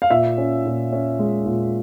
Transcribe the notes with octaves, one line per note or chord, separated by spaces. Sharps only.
F5
A#2 E5
C#4
A#2
C#4
G#3
A#2